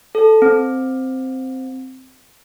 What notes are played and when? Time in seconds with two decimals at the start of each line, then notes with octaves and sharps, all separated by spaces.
0.15 A4
0.42 C4